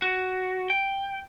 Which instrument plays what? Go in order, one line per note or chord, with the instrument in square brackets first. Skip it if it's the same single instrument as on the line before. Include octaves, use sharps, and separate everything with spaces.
[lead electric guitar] F#4
G5